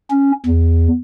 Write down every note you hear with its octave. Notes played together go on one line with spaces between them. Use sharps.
C#4
E2